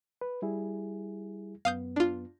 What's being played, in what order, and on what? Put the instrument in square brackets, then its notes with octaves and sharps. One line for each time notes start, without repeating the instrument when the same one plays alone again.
[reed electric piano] B4
G3 E4 G#4
[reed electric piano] F#2 B3 [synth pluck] F5 D#6 G6
[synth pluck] D4 F4